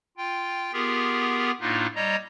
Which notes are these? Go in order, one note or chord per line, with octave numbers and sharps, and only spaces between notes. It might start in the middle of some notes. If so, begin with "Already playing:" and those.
F4 G5
B3 F4 G4 G#4 A#4
A2 A#3 D4 D#4 F4
G3 C#5 D#5 A#5